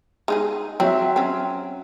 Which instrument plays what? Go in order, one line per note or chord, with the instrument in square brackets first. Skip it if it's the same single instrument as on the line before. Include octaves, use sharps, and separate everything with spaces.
[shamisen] G#3 D#4 G#4
[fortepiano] F#3 E5 [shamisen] C4
[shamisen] C4 C#4